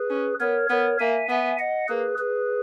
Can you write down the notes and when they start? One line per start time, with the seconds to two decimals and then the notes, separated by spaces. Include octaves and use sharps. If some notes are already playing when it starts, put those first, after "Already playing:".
Already playing: G#4 B4
0.10 C#4
0.40 B3 A#4 C#5
0.70 B3 A#4 C#5
1.00 A#3 E5 G#5
1.29 B3 E5 G#5
1.59 D#5 F#5
1.88 A#3 G#4 B4
2.18 G#4 B4